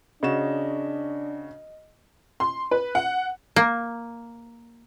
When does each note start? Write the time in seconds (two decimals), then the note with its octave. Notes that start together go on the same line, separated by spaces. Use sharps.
0.23 C#3 D4 F#4 D#5 E7
2.40 C6
2.71 B4
2.95 F#5
3.56 A#3